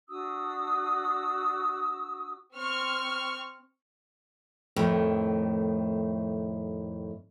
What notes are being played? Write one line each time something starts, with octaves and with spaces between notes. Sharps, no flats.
D4 F#4 D#6 E6
C4 C#6 F6
F2 A2 D#3